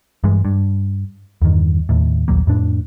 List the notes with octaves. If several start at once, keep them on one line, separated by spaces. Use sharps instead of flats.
G2 E3 G#3
G2
E2 G2 D#3
D#2 A2
A#1 D#2 F#3 A#3
F2 A2 D4